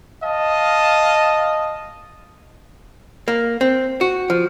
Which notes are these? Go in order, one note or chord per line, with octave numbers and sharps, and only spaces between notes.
D#5 F5 A5
A#3
C4
F#4
F3